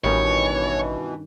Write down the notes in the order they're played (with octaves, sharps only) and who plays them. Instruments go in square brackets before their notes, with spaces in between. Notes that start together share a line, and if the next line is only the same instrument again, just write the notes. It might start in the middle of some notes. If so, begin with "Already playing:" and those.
[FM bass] A1 [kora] G2 D#3 C#4 [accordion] B2 E3 [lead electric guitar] C#5